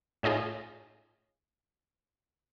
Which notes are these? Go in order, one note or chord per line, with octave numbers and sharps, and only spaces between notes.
A2 C#4 D#4 F4 G#4